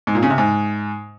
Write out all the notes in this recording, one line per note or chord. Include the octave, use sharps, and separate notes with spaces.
G#2
A#2
C#3
C3
G#2